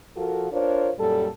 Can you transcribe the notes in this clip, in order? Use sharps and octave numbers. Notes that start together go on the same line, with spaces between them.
F3 F4 F#4 A4 A#4
D4 F4 A#4 C5 C#5
F#2 A#2 G3 A4